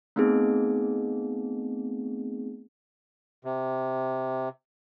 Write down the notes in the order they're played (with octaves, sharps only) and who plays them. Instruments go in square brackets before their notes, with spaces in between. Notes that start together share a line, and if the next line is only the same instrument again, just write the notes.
[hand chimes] A3 B3 C4 D#4 G#4
[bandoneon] C3